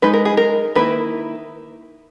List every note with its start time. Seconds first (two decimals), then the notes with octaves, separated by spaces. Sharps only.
0.02 G#3 D#4 B4
0.14 A#4
0.25 G#4
0.37 A#4
0.75 D#3 A#3 E4 B4